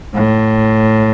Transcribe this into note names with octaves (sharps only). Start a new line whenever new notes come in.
A2